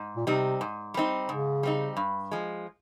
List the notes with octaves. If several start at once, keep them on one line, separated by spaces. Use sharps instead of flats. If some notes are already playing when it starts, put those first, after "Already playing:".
Already playing: G#2
A#2
C3 G3 C4 D#4
G#2
G3 C4 D#4
G#2 C#3
G3 C4 D#4
G2
F3 G#3